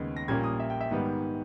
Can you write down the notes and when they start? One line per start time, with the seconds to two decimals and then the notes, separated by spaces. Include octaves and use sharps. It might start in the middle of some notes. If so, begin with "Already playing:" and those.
Already playing: D#2 C#3 G#3 B3
0.17 A#6
0.28 A#1 A#2 G3 A#3 C#4 G#6
0.43 D#6
0.60 E5
0.70 G5
0.81 E5
0.91 G#2 D#3 G3 B3